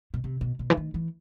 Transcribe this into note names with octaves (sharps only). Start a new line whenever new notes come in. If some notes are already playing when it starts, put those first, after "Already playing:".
B2
C3
B2
B2
E3
D#3
E3